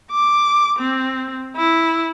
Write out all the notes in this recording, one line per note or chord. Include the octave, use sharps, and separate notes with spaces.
D6
C4
E4